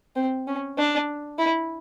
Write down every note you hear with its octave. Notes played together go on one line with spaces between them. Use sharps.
C4
C#4
D4
E4